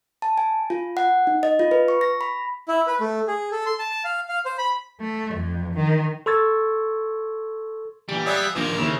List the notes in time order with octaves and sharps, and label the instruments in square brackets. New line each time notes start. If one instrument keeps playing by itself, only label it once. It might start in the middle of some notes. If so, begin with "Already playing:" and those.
[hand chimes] A5
G#5
F4
F#5
D#4
D#5
F4
B4
C#6
A#6
B5
[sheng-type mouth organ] E4
B4
A3
G#4
A4
C6
A5
F5
F5
C5
B5
[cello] A3
F2
D#3
[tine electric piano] A4 C6 C#6 E6 G#6 A6
[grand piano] A#2 E3 D7 [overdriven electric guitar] G3
[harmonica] B3 G#4 E5 [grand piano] D5 F5
[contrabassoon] A#1 [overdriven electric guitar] A#2 D#3 [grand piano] F3 [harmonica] A#4
[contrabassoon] D#2 [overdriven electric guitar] C#3 [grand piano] E4 C5